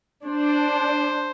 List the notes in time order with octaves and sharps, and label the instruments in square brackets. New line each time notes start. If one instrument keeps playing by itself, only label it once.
[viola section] D4 [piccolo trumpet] C5